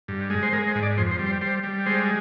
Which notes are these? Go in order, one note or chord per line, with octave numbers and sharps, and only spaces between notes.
G2
G#3
C5
G#3 A#4
C5
G#2
D5
F2 C5
C5
G3
C5
G3 C5
G3
G#3 C5